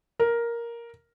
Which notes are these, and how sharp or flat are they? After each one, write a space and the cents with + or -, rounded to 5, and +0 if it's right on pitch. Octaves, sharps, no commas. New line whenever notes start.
A#4 +5